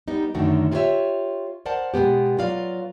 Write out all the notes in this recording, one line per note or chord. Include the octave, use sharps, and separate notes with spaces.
G3 B3 D#4
F#2 D3 D#3 A3 D#4 F#4
E4 F4 G4 A#4 C#5 E5
A#4 C5 D5 F#5 A5
B2 G#3 B3 G4
F#3 F4 B4 D5 F5